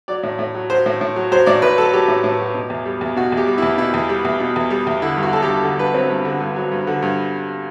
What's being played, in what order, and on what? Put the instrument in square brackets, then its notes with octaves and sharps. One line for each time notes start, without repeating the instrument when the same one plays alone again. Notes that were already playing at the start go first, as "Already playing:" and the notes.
[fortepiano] F#3 D5
A2
A2
F#3
F#3 C5
A2
A2
F#3
F#3 C5
A2 D5
A2 B4
F#3 A4
F#3 G4
A2
A2
F#3
B2
E2
G3
E2
B2 F#4
E2
G4
G3
E2 E4
B2 E4
E2
G3
E2
B2
E2
G3
E2
D3 E4
G2
F#4
F#3 A4
G4
G2
D3
G2 B4
F#3 C4
G2
D3
G2
F#3
G2
D3
G2